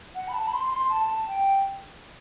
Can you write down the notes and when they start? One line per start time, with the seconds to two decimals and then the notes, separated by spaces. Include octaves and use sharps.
0.15 F#5
0.28 B5
0.34 A5
0.47 B5
0.53 C6
0.72 C6
0.90 A5
1.28 G5